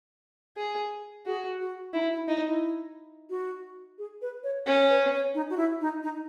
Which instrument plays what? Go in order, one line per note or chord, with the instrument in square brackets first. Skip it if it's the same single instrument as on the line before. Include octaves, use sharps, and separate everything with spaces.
[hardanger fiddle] G#4
[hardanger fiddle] F#4 [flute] G#4
[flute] F#4
[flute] D#4 [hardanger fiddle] E4
[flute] E4
[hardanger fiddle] D#4 [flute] E4
[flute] E4
F#4
G#4
B4
C#5
[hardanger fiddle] C#4 [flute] C#5
[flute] B4
C#5
D#4
F#4
E4
D#4
D#4